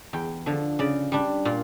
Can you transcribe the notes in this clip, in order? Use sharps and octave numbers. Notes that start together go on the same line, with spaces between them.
E2 G5
D3 F3
C#3 D5
G3 D4
A#2 F4